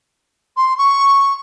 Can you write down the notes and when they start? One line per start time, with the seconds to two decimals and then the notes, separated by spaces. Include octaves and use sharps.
0.57 C6
0.78 C#6